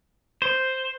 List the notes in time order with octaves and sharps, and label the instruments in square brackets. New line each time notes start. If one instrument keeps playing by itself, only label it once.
[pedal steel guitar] C5